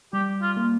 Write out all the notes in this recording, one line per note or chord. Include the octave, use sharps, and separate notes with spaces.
G3 G4
F4
A#3